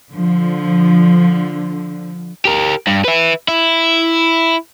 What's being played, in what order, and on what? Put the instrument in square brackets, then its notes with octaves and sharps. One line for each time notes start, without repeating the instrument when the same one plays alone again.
[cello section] D3 F3
[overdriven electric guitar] G4 A#4
G2
B4 E5
E4